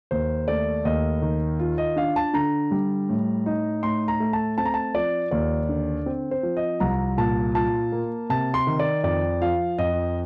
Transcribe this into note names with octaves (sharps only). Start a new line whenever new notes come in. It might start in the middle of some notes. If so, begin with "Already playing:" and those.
D#2 C5
A3 D5
D#2 D#5
D#3
F4
D#5
D4 F5
A5
D3 A#5
G3
A2
D#4
A2 C6
A#5
A3
A5
C4 A5
A#5
A5
F3 D5
D#2 D5
D3
C4
C5
F3
D#5
C2 A#5
A#2 A5
F4 A5
A#3
C3 A5
C6
D#3
D5
F2 D5
F3 F5
F2 D#5